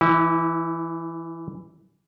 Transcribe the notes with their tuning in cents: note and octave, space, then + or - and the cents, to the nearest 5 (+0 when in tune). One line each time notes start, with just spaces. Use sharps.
E3 +10 E4 -35